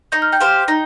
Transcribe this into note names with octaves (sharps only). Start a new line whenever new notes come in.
D#4 G6
F6
G5 G6
G4 C5 F5
D#4